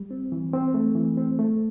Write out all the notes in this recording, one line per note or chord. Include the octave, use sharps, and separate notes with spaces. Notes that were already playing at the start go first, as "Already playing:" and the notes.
Already playing: G3
C4
E3
C4
A3
E3
C4
A3